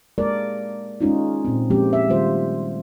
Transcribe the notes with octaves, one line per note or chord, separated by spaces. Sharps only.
G#3 A#3 A#4 D5
G#3 C#4 D#4 F4
A#2 C4
F3 G#3 A#3 C4 C#4 G4
G#3 E5
D#3 G3 A3 F4 C5